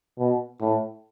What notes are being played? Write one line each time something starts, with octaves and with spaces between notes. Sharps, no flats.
B2
A2